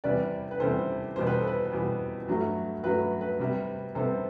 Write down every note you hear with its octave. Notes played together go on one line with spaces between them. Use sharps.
E2 C3 G3 B4 D5
B4
E2 C3 G3 A4 C5
E2 B2 G3 B3 C5
B4
A4
B4
E2 B2 G3 B3
G2 F#3 A3
G2 F#3 A3 B4
B4
C3 G3 B3
C3 G3 B3 A4 C5